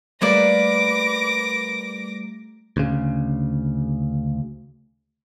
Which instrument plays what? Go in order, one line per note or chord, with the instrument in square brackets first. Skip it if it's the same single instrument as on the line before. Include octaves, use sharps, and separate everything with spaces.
[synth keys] G3 A3 [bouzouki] A#3 B4 D5 [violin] D6 A#6
[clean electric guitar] D2 C#3